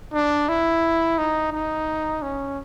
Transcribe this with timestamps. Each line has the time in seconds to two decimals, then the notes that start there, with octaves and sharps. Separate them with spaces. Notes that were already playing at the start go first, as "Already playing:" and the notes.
0.13 D4
0.49 E4
1.18 D#4
1.53 D#4
2.22 C#4